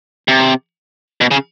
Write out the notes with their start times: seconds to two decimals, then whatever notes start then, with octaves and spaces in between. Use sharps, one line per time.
0.28 C3
1.21 B2
1.31 C#3